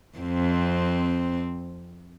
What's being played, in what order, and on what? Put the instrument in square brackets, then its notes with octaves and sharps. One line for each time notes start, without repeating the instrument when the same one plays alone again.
[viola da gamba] F2 C4